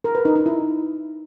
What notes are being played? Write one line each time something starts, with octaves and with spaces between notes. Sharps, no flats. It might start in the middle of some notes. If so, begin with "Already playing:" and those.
A#4
B4
D#4
D#4
E4